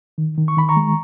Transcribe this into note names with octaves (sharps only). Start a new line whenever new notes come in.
D#3
D#3
C#6
D#3 B5
A#5 C#6
G#3